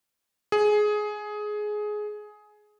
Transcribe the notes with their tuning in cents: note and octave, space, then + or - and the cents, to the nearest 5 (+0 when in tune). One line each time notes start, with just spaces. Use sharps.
G#4 +15